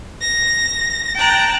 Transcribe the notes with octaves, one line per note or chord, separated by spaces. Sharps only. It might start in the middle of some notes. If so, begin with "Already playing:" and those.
A#6
G5 A5 A#5 F#6